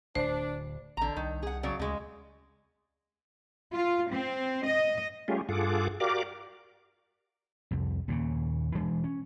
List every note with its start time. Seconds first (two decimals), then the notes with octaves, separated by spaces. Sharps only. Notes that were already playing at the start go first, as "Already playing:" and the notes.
0.15 D1 D2 D4 C5
0.97 A1 D3 A#5
1.16 C2 D#3
1.43 G#4 F#5
1.63 C#3 F#3 D5
1.79 D2 C#3 G#3
3.73 F4
4.11 C4
4.66 D#5
5.28 G3 A3 C#4 F4 G4 G#4
5.49 G2 F4 G#4 A4 F#5 D6
6.00 F#4 G4 A#4 D5 F5 D6
7.71 C2 F2
8.08 D#2 A#2 C#3
8.75 E1 E3 G#3 D4
9.04 C#4